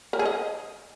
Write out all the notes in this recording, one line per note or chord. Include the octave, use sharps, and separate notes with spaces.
A#4
G#4
D#5